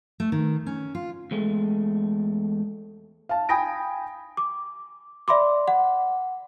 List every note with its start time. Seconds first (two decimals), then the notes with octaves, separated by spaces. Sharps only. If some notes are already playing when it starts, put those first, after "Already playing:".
0.20 A3
0.32 D#3
0.66 C#4
0.95 F4
1.31 E2 G#3 A3
3.29 F5 A5
3.49 G5 G#5 B5 D#6 A#6 D7
4.37 D6
5.28 D5 E5 B5 C6 D6
5.68 F#5